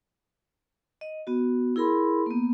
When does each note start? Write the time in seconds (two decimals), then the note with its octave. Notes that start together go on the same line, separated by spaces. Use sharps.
1.01 D#5
1.27 B3 F#4
1.76 E4 G#4 A#4 B5 C6
2.26 A#3 B3